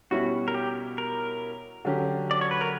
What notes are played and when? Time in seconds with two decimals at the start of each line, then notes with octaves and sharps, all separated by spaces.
0.11 B2 G3 C#4 E4 F#4
0.48 A#4
0.54 G4
0.98 A#4
1.85 D3 F#3 C#4 G4
2.31 D5
2.41 C#5
2.51 B4
2.61 A#4